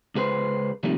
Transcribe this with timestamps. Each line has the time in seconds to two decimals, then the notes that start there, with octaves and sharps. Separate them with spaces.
0.15 C#2 G#4 B4 C5
0.83 C3 D#3 F3 G3 A3 A#3